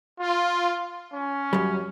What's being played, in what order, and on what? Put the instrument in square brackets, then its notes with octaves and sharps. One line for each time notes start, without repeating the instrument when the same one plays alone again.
[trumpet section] F4
C#4
[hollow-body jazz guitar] F#2 G3